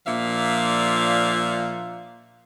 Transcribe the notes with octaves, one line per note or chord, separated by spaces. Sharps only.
A#2 F3 D4 E5 F5